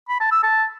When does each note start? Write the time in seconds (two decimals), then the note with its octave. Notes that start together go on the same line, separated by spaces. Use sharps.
0.09 B5
0.20 A5
0.32 E6
0.43 A5